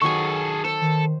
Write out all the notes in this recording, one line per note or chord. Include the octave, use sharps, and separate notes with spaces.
D#3 F#3 G#4 A4 G#5 C#6
A4 C5
D#3